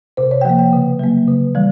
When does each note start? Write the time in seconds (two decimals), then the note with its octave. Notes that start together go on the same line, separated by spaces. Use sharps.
0.17 C3 C5
0.31 C#5
0.41 G5
0.45 F3 A#3 F#5
0.59 G5
0.73 C#3
0.99 F#3 A#3
1.28 C#3
1.55 E3 G3